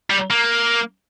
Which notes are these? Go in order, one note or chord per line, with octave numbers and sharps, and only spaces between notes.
G3
A#3